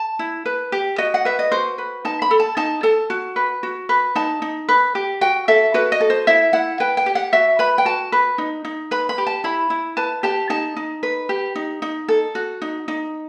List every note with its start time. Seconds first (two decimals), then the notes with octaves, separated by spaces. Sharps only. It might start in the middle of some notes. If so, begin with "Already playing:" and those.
Already playing: A5
0.19 E4
0.45 B4
0.72 G4
0.98 F#4 D#5
1.14 F#5
1.25 B4 E5
1.39 D#5
1.52 F#4 C5
1.78 B4
2.05 D#4 A5
2.22 B5
2.31 A4
2.40 A5
2.57 D#4 A5
2.83 A4 A5
3.10 F#4
3.36 B4
3.63 F#4
3.89 B4
4.15 D#4 A5
4.42 D#4
4.69 B4
4.95 G4
5.21 F#4 G5
5.48 A4 E5
5.74 F#4 B4
5.92 D#5
6.00 A4
6.10 C5
6.27 E4 E5
6.53 E4 F#5
6.80 B4 G5
6.97 G5
7.06 G4
7.15 F#5
7.33 F#4 E5
7.59 B4 B5
7.78 G5
7.85 F#4 A5
8.12 B4
8.38 D#4
8.65 D#4
8.91 B4 B5
9.09 B5
9.18 G4
9.27 A5
9.44 E4 B5
9.70 E4
9.97 B4 A5
10.23 G4 A5
10.50 D#4 A5
10.77 D#4
11.03 B4
11.29 G4
11.56 D#4
11.82 D#4
12.08 A4
12.35 F#4
12.62 D#4
12.88 D#4